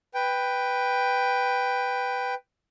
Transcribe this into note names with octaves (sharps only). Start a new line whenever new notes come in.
B4 G5